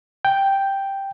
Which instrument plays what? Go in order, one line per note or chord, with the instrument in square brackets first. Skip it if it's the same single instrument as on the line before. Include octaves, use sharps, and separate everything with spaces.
[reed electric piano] G5